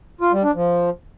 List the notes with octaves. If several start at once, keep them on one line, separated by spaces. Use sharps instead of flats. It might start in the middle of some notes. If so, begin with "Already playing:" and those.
F4
G3
D4
F3